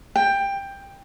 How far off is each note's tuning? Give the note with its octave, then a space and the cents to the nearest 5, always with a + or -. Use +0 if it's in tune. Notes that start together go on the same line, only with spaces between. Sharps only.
G5 +15